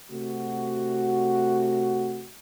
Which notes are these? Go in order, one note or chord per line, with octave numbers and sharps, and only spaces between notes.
C3 A3 F#4